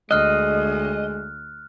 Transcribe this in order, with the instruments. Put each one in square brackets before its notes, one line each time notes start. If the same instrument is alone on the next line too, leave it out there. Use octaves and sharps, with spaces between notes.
[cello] D2 [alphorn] G#3 [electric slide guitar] D#5 [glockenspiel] F6 F#6